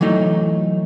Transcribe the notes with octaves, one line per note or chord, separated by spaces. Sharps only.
E3 F#3 A3 D#4